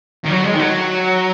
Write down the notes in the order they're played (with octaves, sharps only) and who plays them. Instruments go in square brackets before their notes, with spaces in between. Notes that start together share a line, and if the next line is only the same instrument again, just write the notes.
[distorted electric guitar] D#3
F#3
G#3
D#3
F#3